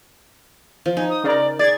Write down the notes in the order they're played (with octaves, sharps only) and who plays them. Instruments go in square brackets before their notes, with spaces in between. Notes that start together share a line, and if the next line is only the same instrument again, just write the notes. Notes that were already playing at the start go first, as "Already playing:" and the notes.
[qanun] F3
[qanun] D#4 [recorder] G#5
[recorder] D#6
[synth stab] C#3 A#4 [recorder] D5
[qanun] G#4 [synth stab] D5 G#6 [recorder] A6